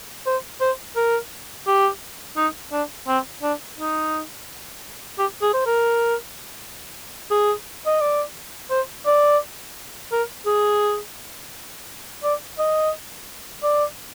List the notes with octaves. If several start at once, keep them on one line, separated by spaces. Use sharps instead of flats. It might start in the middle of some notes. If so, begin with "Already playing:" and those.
C5
C5
A#4
G4
D#4
D4
C4
D4
D#4
G4
G#4
C5
A#4
G#4
D#5
D5
C5
D5
A#4
G#4
D5
D#5
D5